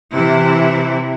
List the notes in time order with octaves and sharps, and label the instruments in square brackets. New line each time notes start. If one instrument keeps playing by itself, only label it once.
[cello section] C3 E3 E4